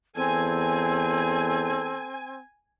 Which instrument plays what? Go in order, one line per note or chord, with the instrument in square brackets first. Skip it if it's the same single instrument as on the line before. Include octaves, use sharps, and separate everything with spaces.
[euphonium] E2 [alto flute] C4 [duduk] A4 [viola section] G#5